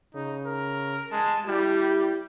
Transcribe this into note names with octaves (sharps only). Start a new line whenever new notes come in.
C#3 D#4
A#4
G#3 A5
G3 E4 G4